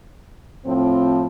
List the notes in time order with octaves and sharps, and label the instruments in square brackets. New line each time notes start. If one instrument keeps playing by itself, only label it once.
[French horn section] A2 F3 C4